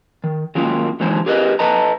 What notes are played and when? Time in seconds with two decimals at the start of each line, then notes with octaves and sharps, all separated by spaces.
0.24 D#3
0.55 D#3 F#3 G#3 A#3 C#4 F4
1.00 D3 E3 F#3 G#3 D#4 C5
1.26 G4 G#4 A#4 B4 D#5
1.59 A4 B4 D#5 A5 A#5